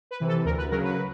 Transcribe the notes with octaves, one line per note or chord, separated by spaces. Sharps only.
B4
C3 E3
A4
D2 A#4
B4
C#3 F#3 A#4
B4